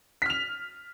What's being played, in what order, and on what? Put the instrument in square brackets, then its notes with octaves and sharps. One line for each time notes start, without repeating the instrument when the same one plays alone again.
[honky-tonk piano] B6
F6
F7